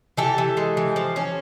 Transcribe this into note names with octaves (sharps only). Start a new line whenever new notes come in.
E3 G4 A4
E3
G#3
E3
F3
C#4